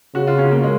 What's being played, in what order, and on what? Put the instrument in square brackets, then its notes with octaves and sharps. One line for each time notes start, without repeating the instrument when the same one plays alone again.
[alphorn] C#3 [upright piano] F#4
[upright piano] F4
C#4
A#3
G#3